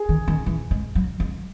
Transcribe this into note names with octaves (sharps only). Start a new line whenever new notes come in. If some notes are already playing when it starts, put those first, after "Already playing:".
Already playing: G#4
D#3
D#3
E3
G#3
F#3
G#3